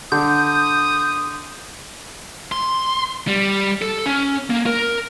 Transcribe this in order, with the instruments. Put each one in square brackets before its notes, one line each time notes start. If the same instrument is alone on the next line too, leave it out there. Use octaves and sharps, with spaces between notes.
[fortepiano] D3 [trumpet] D#6 [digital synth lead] G6
[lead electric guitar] C6
G3
A4
C#4
A#3
A#4